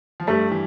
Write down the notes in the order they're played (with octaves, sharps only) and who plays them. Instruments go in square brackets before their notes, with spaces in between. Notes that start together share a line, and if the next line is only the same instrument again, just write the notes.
[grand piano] F3
[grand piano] G2 G3 [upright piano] A3
[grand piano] E3